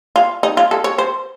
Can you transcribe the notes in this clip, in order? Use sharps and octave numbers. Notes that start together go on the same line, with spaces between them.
F4
D#4
F4
A4
C#5
C5